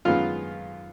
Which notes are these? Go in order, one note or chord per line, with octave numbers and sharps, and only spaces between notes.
F#2 D#3 G#3 B3 F4 F5